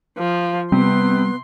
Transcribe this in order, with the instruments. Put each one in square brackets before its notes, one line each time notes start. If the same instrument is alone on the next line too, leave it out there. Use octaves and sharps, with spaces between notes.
[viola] F3 [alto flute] F5
[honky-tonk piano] C3 [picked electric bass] G3 [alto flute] B3 [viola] C6